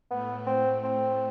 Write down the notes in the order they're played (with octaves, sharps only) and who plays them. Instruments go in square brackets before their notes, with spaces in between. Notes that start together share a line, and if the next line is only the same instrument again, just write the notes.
[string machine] A2 A3 [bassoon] B3
[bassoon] C4
C4